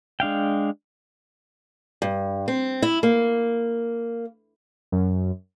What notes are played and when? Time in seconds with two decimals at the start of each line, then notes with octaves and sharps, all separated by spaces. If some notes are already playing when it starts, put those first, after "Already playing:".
0.20 G#3 D4 F5 G5
2.02 G2
2.48 C4
2.82 E4
3.03 A#3
4.92 F#2